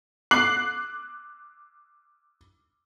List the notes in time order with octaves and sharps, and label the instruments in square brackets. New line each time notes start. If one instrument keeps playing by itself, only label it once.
[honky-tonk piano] D6 F#6 C7 F#7